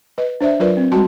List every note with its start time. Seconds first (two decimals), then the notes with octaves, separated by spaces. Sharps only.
0.18 B4 D#5
0.41 D4 C5 D5 E5
0.60 F#3 F4 A#4 B4 D5
0.77 C4
0.92 G3 G#3 F#4 G5 A5 C6